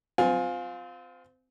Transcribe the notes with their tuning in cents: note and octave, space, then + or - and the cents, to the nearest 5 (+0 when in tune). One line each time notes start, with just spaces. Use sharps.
C4 -25 F4 +20 G#5 +0